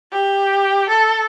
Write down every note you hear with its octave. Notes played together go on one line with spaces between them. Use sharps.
G4
A4